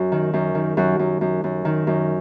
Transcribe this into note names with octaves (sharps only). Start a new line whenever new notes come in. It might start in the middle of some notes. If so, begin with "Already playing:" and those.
Already playing: F#2 F#4
D#3
F#2
D#3
F#2 F#4
F#2
F#2
F#2
D#3
F#2